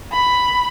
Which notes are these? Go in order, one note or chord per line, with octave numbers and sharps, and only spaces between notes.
B5